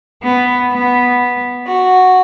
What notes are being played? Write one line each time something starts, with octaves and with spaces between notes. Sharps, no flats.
B3
B3
F#4